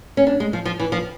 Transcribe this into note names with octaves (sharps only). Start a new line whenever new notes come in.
C#4
D4
G#3
F3
F3
E3
F3